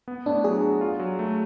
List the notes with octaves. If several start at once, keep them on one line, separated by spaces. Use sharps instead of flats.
B3
A2 D4
F#3 G#4
F#4
F4
F#3
A3